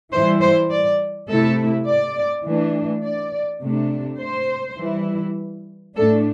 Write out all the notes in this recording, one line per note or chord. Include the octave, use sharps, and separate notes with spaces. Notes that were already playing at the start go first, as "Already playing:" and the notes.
E3 G3 E4 C5
C5
D5
C3 A3 E4 A4
D5
E3 A3 D4
D5
C3 A3 D4
C5
E3 G3 E4
A2 A3 D4 A4